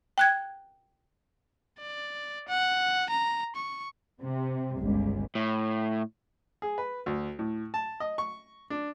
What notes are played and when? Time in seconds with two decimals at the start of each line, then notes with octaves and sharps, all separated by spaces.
0.18 G5 F#6 G#6
1.79 D5
2.48 F#5
3.10 A#5
3.56 C#6
4.22 C3
4.77 G1 C#2
5.35 A2
6.62 G#4
6.78 B4
7.06 D2
7.39 A2
7.74 A5
8.00 D#5
8.18 C#6
8.70 D4